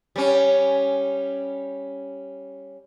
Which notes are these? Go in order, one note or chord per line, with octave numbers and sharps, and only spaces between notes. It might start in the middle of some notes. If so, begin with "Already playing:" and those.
G3 C#4